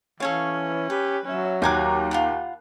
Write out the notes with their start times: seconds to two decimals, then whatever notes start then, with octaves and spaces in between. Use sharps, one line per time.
0.20 E3 C#4 A4 C#5 F5
0.90 G4 B4
1.26 F#3 C#4 E5
1.62 D#2 G4 C5 G#5 A#5 D6 F#6
2.11 F4 F#5 B5